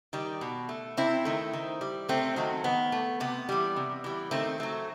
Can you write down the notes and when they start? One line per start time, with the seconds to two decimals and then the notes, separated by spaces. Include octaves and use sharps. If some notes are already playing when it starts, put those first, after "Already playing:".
0.13 D#3 G3
0.41 B2
0.69 A3
0.97 C3 C4 E4
1.25 D#3 A3
1.53 D#3
1.81 G3
2.09 C3 A3 C4
2.36 D#3 F#3 A3
2.64 D#3 B3
2.92 A3
3.20 C3 B3
3.49 E3 G3
3.76 C3
4.04 E3 G3
4.31 D#3 A3 C4
4.60 F#3 A3